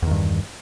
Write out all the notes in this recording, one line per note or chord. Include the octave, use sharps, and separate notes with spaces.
E2 G2 D#3